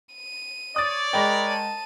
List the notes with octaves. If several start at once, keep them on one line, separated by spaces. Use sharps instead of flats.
D#7
C#5 D5 D#6 A6
G#3 A#4 D#5 G5 B5
A5 D#7